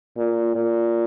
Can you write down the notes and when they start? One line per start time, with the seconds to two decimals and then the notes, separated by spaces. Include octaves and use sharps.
0.17 A#2
0.55 A#2